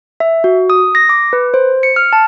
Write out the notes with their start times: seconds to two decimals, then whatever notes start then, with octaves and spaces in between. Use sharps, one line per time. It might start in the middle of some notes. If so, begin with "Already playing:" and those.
0.20 E5
0.44 F#4
0.70 D#6
0.95 A#6
1.09 D6
1.33 B4
1.54 C5
1.83 C#7
1.96 F6
2.13 A5